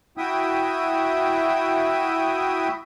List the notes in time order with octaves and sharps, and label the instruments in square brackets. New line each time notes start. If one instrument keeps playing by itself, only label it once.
[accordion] E4 F#4 E5 G5 D#6